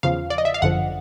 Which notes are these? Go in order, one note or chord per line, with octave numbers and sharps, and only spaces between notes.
E2 C#3 F3 F5
D5
D#5
E5
F5
G1 F#2 D3 F3 F#5